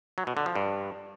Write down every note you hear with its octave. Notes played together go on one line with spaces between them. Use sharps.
F#3
B2
D3
F3
G2